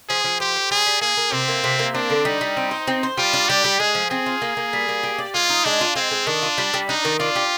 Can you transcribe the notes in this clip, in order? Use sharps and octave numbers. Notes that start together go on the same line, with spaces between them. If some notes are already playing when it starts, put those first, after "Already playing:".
F3 G#4
F3
G4 C5
C5
G3 G#4
G3
A#3 G#4
A#3
C3 C4
A#3
C3
A#3
C4 D4
D3
G3 D#4
G3
C4
C5
C4
C5
G3 F4
D4
G3 G4
G3
G#3 G#4
F3
C4 G#4
F4
A#3
A#3
G3
A#3
G4
D5
G#3 F4
D#4
G#3 D4
F4
G#3 C4
G#3
D#3 D4
F4
G3
G3
D4 D#4
D#3
D4 F4
G4